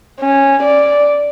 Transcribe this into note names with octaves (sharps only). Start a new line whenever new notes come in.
C#4
D5